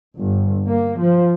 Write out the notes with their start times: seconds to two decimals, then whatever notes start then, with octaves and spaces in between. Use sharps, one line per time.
0.18 G1
0.68 A#3
1.00 F3